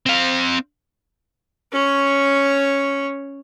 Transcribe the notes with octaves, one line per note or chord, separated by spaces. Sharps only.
C4 F5
C#4 C#5